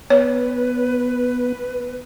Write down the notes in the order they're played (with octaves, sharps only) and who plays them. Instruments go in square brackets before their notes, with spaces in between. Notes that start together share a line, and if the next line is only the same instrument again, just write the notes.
[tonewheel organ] B3 [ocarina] B4 [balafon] C#5